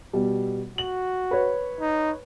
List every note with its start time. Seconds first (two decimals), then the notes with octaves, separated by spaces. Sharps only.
0.13 B2 G3
0.78 F#4 F#7
1.31 B4 C#5
1.81 D#4